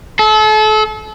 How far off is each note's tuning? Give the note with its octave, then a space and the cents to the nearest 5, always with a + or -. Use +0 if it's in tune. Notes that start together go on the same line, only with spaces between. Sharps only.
A4 -35